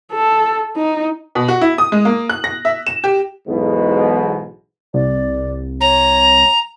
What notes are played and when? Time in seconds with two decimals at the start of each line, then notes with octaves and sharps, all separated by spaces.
0.13 A4
0.77 D#4
1.35 B2
1.48 F#4
1.61 E4
1.78 D#6
1.92 G#3
2.05 A#3
2.30 F#6
2.44 A#6
2.65 E5
2.87 E7
3.04 G4
3.47 B1 E2 G#2 B2
4.94 C2 D5
5.81 C#5 A#5